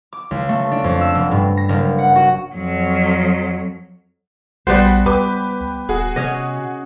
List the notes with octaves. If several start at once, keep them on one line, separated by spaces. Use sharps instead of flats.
D6
C#2
A3
D4
F2
E6
F1
G2
A#6
F#1
F#5
F#4
F2 F#3
A#1 G3 B3 F#4 C5
C#2 G4 B4 D6
D#1 F#4 G#4
C3 C#4 D#5